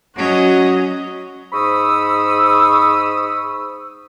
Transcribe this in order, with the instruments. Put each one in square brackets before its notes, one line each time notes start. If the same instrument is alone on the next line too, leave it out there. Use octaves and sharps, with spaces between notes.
[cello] F#3 C#4 [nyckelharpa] F#4 D#5
[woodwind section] G#2 C5 B5 C#6 D#6 E6